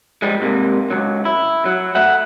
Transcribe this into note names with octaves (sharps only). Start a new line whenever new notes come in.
F3 G3 G#3
G#2 C3 A#3
C#2 F#3
E4
F#3
A3 E5 F#5